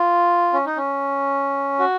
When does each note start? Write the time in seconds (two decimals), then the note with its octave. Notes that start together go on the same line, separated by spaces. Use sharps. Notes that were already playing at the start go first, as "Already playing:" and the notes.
Already playing: F4
0.53 C#4
0.66 D#4
0.77 C#4
1.80 F#4